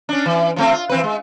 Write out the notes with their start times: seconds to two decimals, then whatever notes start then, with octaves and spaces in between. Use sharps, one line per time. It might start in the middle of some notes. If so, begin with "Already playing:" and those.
0.09 C#4 D4
0.26 E3
0.56 F3 A3 C4
0.73 F4
0.89 E3 C4 B4
1.04 G#3